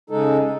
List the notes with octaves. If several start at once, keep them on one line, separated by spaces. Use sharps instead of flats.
C#3 G#3 D#4 A4